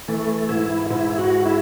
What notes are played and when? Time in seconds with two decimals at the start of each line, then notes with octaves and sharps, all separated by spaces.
0.08 E3 A3
0.49 G#2 E4
0.90 G#2 E4
1.18 F#4
1.31 G#3
1.46 E4